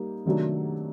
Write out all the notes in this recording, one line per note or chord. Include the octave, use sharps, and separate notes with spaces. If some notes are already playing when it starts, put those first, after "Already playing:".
Already playing: G3 A#3 D#4
C3 D#3 F#3 A3 D4